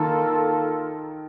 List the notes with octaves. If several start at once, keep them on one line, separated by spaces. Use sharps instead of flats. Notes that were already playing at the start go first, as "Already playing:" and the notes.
Already playing: D#3 A#3 F4 A4